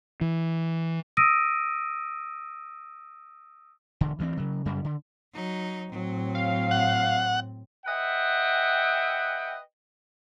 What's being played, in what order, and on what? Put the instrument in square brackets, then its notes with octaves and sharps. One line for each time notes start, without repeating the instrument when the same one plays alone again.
[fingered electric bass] E3
[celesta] D#6 E6 A#6 D7 D#7
[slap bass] E1 D3
D2 E3 A#3 C4
C#3 F#3
F#2 C#3 G3
D3
[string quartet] F#3 D#4
[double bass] A2 C4 [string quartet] F#3
[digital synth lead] F5
[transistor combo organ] F#5
[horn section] B4 D#5 E5 F#5 G5